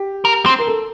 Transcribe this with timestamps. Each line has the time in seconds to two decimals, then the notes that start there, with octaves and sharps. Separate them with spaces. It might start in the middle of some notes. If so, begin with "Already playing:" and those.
Already playing: G4
0.25 A#4
0.46 C4
0.59 A#4
0.67 A4